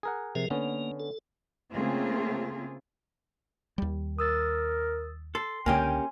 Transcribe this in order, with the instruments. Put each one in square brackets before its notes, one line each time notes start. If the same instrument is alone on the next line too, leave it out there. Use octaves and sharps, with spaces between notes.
[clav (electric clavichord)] G#4 A#4 F#5
[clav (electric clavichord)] C3 [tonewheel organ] F3 G#4 A#4
[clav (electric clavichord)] D3 B3 C#4 [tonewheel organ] A#3
[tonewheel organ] A4
[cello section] C#3 A3 A#3 C4 F4 G#4
[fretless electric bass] D#2 G3
[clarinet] A#4 [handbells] D#6 E6 A6
[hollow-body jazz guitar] A4 [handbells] C6 C7
[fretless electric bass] C#2 D3 [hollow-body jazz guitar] A#3 C#4 G4 [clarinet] G5 [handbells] G#5 C6